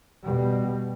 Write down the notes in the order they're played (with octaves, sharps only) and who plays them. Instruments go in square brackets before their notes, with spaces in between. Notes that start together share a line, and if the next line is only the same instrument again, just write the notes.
[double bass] B2 G3